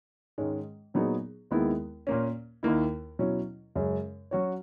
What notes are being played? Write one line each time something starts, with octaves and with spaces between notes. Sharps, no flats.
G#2 D#3 G#3 C#4
A#2 F#3 B3 D#4 G#4
D#2 D#3 G#3 B3 E4
A#2 A#3 C#4
D#2 D#3 A#3 E4
B2 F#3 C#4 E4
F#2 C#3 G#3 C#4
F#3 C#4 F#4 C#5